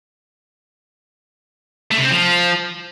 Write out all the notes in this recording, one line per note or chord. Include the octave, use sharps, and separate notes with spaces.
A3
C3
C4
F3